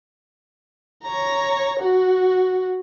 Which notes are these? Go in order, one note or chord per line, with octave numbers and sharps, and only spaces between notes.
C#5 A#5
F#4